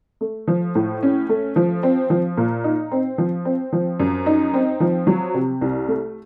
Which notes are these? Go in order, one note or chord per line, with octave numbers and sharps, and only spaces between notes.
A3
F3
A2
C#4
A3
F3
C4
F3
A#2
D#4
C4
F3
C4
F3
F#2
D#4
C4
F3
F#3
C3
C2
A3